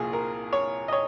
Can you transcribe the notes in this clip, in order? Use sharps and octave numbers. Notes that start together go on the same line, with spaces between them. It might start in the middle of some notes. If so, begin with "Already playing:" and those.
Already playing: C2 A#2 F3 G#4
A#4
C#5
D#5
C#5